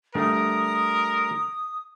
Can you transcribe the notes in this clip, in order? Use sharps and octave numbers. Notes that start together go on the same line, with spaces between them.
G3 A3 D4 A#4 D#6